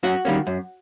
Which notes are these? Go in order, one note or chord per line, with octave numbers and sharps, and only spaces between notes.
F#2 F#4 F#5
D#3 G3 A#3 C#4
F#2